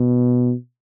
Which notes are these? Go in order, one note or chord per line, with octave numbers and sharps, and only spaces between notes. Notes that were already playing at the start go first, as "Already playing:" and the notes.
Already playing: B2